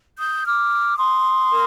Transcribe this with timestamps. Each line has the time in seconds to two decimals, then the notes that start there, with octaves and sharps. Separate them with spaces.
0.19 D#6 G6
0.45 D6 F6
0.97 C6 D#6
1.50 A#4